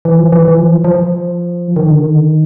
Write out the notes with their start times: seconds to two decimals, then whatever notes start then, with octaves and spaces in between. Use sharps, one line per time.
0.05 E3
0.19 F3
0.32 E3
0.45 E3
0.58 F3
0.84 F3
1.76 D#3
1.90 D3
2.03 D#3